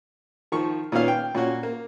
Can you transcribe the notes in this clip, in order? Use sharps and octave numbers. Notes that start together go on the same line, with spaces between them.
D#3 F3 C#6
A#2 D#3 B3 C#4 F5 F6
G5
A#2 C#4 F#4
A#3